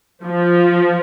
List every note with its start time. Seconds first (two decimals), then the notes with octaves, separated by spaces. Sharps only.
0.24 F3